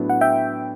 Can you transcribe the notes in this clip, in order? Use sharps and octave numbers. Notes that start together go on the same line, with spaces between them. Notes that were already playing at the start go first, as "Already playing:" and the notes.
Already playing: A2 F#3 B3 D4
F#5
E5 G5